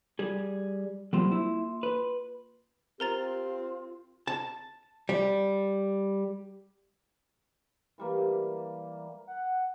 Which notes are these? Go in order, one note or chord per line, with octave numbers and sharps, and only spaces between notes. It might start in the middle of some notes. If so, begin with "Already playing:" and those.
G3 G#4
F#3 G3 A#3 C4 F4 C6
E4
B4
C4 F4 G4 A#4 A#5 A6
A5
G3
E3 G3 A#3
F#5